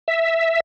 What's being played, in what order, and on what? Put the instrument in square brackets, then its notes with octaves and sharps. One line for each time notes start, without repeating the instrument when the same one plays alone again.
[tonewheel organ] E5